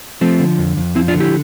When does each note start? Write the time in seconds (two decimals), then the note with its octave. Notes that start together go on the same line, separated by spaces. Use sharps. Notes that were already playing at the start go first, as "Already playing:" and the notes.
0.21 F3 A3 C4
0.40 D3
0.58 F2
0.77 F2
0.95 F3 C4 E4
1.08 D4 F4
1.14 D3
1.20 E4 G4